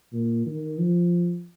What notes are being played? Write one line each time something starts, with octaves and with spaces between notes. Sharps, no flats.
A#2
D#3
F3